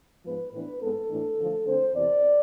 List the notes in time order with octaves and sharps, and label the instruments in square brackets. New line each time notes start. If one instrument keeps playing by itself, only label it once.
[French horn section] G#2 F3 G#3 B3 B4
A2 E3 B3 D4 B4
G#2 G#3 B3 A4
A2 E3 A3 D4
D3 F3 A3
D3 A3 C4 C5
E2 C3 E3 D5